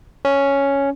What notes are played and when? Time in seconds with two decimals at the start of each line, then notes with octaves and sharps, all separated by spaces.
0.25 C#4